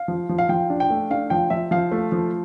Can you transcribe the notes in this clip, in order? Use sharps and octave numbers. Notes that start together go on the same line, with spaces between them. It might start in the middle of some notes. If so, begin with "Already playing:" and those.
Already playing: F5
F3
F3
F5
F3 G5
D4
G5
A3
D4 F5
F3 G5
F3 E5
F3 F5
A3
F3